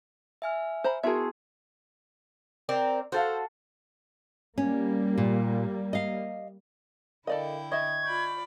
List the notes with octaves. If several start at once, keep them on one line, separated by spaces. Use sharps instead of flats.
E5 G#5 F6
C5 A#5 B5
B3 E4 F#4 G#4 A#4 E5 A5 C6
C4 A#4 D5
F#4 A4 C5 F5
G3 A#3 C#4
A#2
D#5 F5
D3 E4 A4 A#4 D5 D#5 F5 G5
D#5 E5 C#6 D#6 G#6
F4 D5 B5 C#6 G6